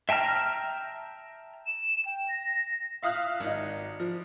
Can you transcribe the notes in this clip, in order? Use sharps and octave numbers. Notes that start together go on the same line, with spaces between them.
E5 G5 A5 A#5 F6
E7
G5
A#6
E5 F5 D#6 F6 F#6
G#1 D#4
F3